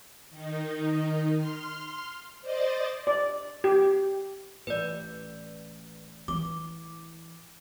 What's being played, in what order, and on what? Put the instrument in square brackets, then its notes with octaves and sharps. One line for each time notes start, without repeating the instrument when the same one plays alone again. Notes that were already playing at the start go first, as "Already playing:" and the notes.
[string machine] D#3 D#4
C6 F6
C5 D5 D#5 A6
[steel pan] D5
G4
[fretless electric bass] A1 [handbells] B4 D5
[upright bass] E3 [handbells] D6